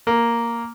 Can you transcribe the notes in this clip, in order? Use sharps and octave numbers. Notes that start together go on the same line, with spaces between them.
A#3